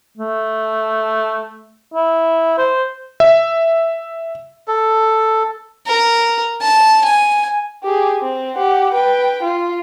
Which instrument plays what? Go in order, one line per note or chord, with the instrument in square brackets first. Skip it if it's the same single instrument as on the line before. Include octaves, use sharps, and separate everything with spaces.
[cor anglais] A3
E4
C5
[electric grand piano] E5
[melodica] A4
[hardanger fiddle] A#4
A5
G#5
[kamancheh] G4 G#4
C4
G4 F#5
B4 G5
F4